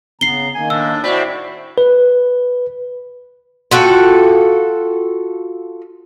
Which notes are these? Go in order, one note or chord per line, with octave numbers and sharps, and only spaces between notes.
C#3 B3 A#5 C7 G7
D#3 A#3 G#5
A2 D4 E6
A2 C4 E4 F#4 D5 B5
B4
F4 F#4 A4 G5